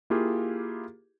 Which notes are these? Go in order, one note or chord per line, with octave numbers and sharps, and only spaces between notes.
A#3 E4 F4 G4 G#4